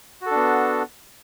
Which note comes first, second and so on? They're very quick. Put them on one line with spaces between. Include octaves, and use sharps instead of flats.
F#4 A4 D4 B3